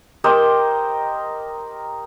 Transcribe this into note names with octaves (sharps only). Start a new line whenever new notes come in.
G4 A#4 C5 D#5